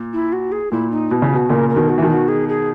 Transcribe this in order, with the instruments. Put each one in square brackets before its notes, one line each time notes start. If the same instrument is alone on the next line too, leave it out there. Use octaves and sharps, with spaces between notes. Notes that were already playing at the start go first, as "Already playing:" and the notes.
Already playing: [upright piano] A#2
[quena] E4
F#4
G#4
[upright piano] A#2 [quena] E4
[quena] D#4
[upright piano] B2 [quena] E4
[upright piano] C#3
[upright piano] B2 [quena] F#4
[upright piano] A#2 C#3 [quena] A#4
[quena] A#4
[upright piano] B2 D#3
[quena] F#4
[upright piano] E3
B2 D#3
[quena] F#4
G#4
G#4